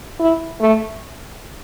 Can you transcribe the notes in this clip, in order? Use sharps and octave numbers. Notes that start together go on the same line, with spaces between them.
E4
A3